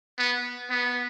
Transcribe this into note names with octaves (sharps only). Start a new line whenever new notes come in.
B3
B3